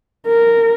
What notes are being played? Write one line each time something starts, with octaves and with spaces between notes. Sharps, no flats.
A#4